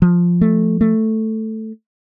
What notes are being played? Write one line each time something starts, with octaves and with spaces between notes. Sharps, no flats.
F3
A3
A3